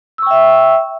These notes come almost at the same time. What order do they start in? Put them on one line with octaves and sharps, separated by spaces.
E6 C#6 G5 E5